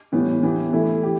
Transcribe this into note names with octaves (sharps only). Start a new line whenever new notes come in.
A2 E3 G3 B3
E3 B3 G4
E3 A3 E4
G4